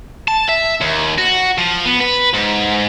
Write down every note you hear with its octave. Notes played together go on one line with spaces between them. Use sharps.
A5
E5
D#2
F#4
F3
B3
B4
G#2